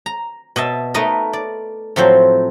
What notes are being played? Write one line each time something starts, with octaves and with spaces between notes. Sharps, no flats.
A#5
B2 D#5 E5 A5
A3 D#4 A#4 B4 D#5
D5
A2 F3 F#3 C4 C5